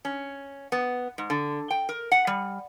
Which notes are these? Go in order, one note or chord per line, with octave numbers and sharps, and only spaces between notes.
C#4
B3
G#2
D3
G5
A#4
F#5
G3